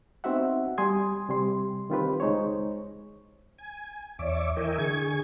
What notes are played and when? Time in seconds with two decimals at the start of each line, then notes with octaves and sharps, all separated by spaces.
0.24 B3 C4 D#4 F#4 E5 F#5
0.78 G3 G#5 C6 D#6 G#6
1.29 C3 G3 C6
1.90 D#3 C4 F4 G4 B4
2.20 C#2 G#3 D#4 C5 C#5
3.58 G#5
4.19 E2 C#5 D5 E5 C#6 D6
4.57 E3 A#4 D#5 E5 G5 G#5
4.78 D3 G#4 G#5 C#6 G#6